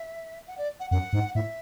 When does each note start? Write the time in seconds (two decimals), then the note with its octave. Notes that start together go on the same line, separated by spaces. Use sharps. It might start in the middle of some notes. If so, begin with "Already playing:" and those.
Already playing: E5
0.47 F#5
0.58 D5
0.80 F#5
0.91 F#2 F#5
1.13 G#2
1.35 A2 E5